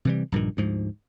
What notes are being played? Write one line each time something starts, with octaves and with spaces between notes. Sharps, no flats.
C3 E3 G3
A#1 G2 A#2 D#3
D2 G#2 F3